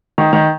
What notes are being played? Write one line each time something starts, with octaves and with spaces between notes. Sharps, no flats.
D#3
D#3